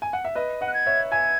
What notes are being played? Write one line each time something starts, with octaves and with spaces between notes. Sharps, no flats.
G#5
F#5
E5
B4 D#5
D#5 F#5
F#6
G#6
C#5 E5
E5 G#5 G#6